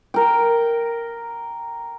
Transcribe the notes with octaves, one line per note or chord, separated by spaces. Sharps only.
A#4 G5